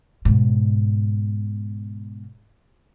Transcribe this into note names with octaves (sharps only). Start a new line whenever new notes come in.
G#2 B2